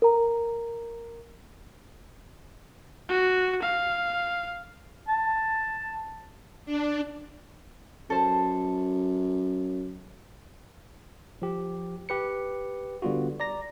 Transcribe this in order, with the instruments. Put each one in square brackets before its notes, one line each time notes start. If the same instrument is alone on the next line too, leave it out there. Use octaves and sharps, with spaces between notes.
[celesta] A#4 A#5
[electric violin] F#4
F5
[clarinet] A5
[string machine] D4
[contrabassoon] F#2 [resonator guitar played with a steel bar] A4 C5
[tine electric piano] F3 G4
G4 B4 C#7
D3 G3 B3 F4 F#4
D5 A#5 A#6